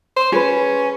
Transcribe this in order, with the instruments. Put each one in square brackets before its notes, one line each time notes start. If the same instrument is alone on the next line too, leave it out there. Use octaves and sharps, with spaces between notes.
[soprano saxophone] C5
[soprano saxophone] C#4 [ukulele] G#4 B4